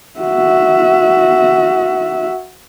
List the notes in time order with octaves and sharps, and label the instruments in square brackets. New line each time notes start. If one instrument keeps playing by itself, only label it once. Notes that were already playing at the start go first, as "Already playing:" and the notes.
[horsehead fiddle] F#4 E5